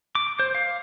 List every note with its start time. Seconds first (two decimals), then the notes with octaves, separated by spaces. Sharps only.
0.15 D6
0.40 C5
0.55 F5